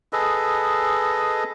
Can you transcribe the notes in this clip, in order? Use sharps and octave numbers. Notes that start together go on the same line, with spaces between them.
G#4 A4 B4 D#5